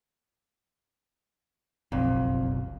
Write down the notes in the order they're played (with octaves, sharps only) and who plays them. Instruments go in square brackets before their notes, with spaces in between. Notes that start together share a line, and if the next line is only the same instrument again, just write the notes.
[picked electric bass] F#1 B1 [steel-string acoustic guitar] F2